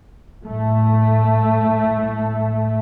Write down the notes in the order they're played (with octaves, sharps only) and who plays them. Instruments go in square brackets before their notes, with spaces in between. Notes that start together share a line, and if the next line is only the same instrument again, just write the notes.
[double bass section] A2 A3